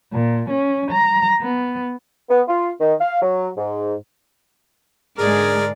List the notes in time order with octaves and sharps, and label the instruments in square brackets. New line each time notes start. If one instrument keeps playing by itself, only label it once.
[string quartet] A#2
C#4
A#5
B3
[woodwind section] B3
F4
D#3
F5
F#3
G#2
[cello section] G#2 D3 G#3 [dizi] G#4 [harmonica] A#4 [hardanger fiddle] D5